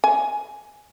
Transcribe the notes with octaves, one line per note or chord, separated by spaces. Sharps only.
G#5